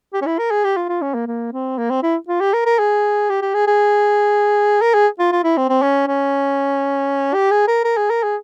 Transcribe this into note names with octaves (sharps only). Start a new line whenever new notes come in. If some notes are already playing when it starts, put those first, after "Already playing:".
G4
C#4
E4
A#4
G#4
G4
F4
F4
C#4
A#3
A#3
C4
A#3
C4
E4
F4
G4
A#4
A#4
G#4
G4
G4
G#4
G#4
A#4
G#4
F4
F4
E4
C4
C4
C#4
C#4
G4
G#4
A#4
A#4
G#4
A#4
G#4